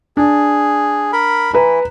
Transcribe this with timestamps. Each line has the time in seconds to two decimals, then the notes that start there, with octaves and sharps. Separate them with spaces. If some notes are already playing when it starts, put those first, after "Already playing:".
0.17 D4 G#4
1.13 A#4 B5
1.54 E3 E4 B4 A#5